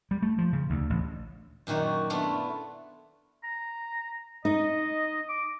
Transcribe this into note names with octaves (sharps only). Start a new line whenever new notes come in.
G3
A3
F3
C#3
D2
A1
F#2 A#2 D#3 F#4 C#5
A3 B3 D4 E4 F4
A#5
D#4 D#5
D6